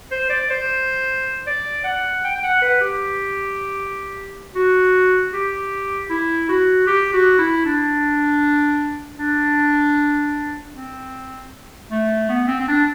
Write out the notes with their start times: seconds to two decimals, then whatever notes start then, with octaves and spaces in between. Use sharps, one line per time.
0.11 C5
0.29 D5
0.50 C5
1.47 D5
1.84 F#5
2.24 G5
2.36 G5
2.43 F#5
2.62 B4
2.81 G4
4.55 F#4
5.33 G4
6.09 E4
6.49 F#4
6.87 G4
7.13 F#4
7.38 E4
7.65 D4
9.19 D4
10.74 C4
11.90 A3
12.29 B3
12.48 C4
12.60 C4
12.68 D4